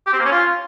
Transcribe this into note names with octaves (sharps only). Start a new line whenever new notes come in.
G4
C4
A#3
C#4
F4